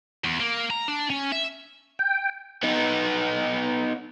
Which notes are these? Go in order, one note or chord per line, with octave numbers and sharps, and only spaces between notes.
E2
A#3
A#5
D4
C#4
E5
G5
B3 D#4